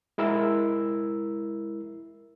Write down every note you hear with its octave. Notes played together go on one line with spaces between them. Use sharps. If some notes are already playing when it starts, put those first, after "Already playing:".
G#3 E4 A#4 E6